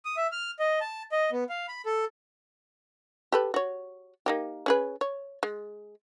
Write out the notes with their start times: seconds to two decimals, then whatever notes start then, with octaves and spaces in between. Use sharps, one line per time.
0.05 D#6
0.17 E5
0.32 F6
0.59 D#5
0.81 A5
1.12 D#5
1.32 B3
1.49 F5
1.68 B5
1.86 A4
3.32 G4 A4 B4
3.54 F#4 C#5
4.26 A#3 D#4 G4
4.66 C#4 G#4 B4
5.01 C#5
5.43 G#3